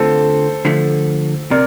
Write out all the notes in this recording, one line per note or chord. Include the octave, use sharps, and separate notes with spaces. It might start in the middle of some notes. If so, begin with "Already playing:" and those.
Already playing: D3 A3 C4 F4 A4 C5
D3 F3 A3
C3 A#4 D5